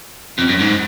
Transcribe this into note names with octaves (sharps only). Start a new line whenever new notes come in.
F2
F#2
G#2